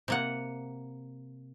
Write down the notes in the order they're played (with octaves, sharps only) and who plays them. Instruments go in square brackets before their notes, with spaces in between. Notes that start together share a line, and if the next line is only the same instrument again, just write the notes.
[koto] C3 A#3 F#5